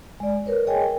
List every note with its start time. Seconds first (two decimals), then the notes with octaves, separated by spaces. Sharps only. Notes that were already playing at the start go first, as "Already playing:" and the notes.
0.20 G#3 D5
0.46 A#4 B4 C#5
0.67 G#4 C#5 D#5 G5 G#5
0.81 A#4 G5